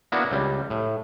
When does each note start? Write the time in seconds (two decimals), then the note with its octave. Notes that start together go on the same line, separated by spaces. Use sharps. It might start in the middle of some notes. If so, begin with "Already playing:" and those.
0.12 A#3 B3 D4 E4 F#4
0.31 C#2 G3
0.70 A2